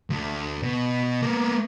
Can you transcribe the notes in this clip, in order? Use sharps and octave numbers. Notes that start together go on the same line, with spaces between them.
D2
B2
A#3 B3